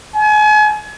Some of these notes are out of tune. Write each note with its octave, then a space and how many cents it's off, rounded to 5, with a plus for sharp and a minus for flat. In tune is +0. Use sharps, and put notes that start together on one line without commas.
G#5 +35